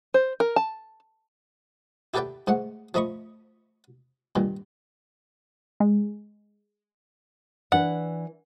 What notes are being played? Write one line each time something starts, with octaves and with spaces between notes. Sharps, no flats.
C5
A#4
A5
E4 G4 A4 B4 D5 G5
G#2 A3 F#5
F3 A3 D#5 B5 C#6
G2 A#2 D#3
G#3
E3 D4 B4 F#5